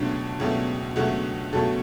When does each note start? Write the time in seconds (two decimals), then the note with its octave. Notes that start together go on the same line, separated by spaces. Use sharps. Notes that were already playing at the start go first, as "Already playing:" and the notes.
Already playing: C#2 B2 F#3 A3 D4
0.40 C#2 B2 F#3 A3
0.96 C#2 B2 F#3 A3 F#4
1.53 C#2 B2 F#3 A3 A4